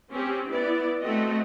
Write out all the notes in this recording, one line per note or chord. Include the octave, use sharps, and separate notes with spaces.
C4 C#4 G4
B3 E4 D5
A3 C4 F#4 D#5